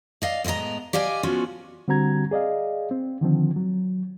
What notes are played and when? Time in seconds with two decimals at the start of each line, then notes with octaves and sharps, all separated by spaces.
0.22 D5 D#5 F5
0.44 A2 G#3 B3 D#5 A#5
0.93 G4 D5 D#5 F5 G#5
1.23 F3 B3 C#4 F4 F#4
1.88 D3 G3 C4 F#4 A#5 G#6
2.31 G#4 D5 D#5 F5
2.91 C4
3.21 D3 D#3 F3 C4
3.56 F#3